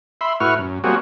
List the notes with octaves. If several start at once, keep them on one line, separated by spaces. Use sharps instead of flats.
E5 B5 C6
A2 E4 F#4 B4 C#6 F6
F#2
F#3 G3 A#3 C4 F#4 G#4